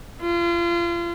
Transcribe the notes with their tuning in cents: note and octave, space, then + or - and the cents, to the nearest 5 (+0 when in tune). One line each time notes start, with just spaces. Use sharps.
F4 -35